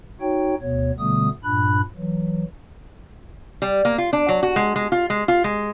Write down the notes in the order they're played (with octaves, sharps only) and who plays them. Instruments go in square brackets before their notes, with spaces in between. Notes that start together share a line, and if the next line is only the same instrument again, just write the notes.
[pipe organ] D#4 F#4 C#5 G5
D2 B2 B3 C#5
B2 D3 G3 A3 B3 D#6
G2 A#2 D4 B5 F#6
E3 F#3
[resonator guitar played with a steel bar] G3
A#3
F4
D4
F#3
F#4
G#3
G#3
F4
G#3
F4
G#3